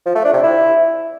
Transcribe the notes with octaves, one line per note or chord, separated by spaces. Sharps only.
F3
A3
D4
C3
E4